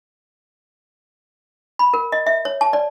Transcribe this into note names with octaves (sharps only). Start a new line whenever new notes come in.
B5
A#4
D#5
E5
C#5
A5
D5